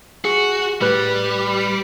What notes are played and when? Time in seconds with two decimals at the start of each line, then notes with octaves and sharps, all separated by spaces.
0.25 F#4 G#4
0.81 A2 G3 B4 F#6